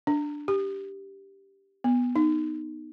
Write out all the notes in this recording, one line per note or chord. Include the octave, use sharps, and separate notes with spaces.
D4
G4
B3
D#4